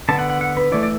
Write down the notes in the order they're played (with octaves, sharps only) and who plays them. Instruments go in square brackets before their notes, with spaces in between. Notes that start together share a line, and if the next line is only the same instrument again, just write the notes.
[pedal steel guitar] D3 B3 A5
F#5
F#5
F#5
B4
E3 A3 D5
D5